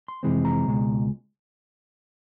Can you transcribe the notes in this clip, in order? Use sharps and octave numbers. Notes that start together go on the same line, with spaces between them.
C6
F2 C3 E3 G#3 C4
A#5
C#2 B2 G#3